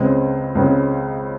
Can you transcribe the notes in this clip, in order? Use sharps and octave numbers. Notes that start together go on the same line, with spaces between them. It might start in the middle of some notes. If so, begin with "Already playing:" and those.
Already playing: C#2 C#3 G#3 C4
C#2 C#3 G#3 C4